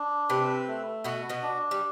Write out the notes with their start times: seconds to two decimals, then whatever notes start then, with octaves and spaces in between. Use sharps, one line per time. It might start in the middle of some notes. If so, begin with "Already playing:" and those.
Already playing: D4
0.30 C3 C4 B4
0.68 A3
1.04 B2 B3 F#4
1.29 B2 B3
1.42 D4
1.71 G3